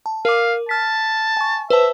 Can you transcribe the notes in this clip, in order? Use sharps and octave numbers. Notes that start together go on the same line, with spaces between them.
A5
A#4 F5 D6
A5 F6 B6
G#5 C#6
B4 C5 E5 A5